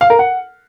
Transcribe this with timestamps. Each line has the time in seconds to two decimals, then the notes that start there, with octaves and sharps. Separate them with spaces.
0.01 F5
0.10 A#4
0.19 F#5